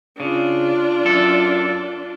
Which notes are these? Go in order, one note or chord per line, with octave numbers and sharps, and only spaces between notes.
C#3 D4 F4
F#2 A4